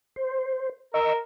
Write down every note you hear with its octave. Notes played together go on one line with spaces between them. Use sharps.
C5
A#4 D#5 C#6 E6